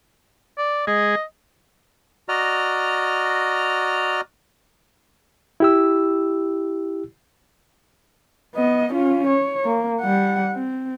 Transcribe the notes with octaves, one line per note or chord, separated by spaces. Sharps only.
D5
G#3 G#4 D#5
F#4 D5 D#5 A#5 F6
E4 G4 E6
B3 D#5
C#4 F4
C#5
A#3
G3 F#5
C4